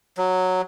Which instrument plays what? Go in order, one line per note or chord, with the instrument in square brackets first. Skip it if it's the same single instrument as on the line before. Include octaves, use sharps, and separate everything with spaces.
[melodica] F#3